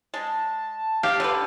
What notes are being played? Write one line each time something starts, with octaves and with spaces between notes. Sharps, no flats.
G#3 A5
G4 F5 A5
D3 B4